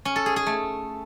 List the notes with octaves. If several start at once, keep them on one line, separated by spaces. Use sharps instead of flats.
C#4
A4
G#4
G#4
A3